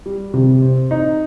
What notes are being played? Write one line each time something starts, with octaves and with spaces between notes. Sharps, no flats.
G3
C3
C4
D#4